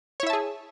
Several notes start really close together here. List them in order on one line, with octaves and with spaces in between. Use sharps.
C#5 E4 E5 A5 G#4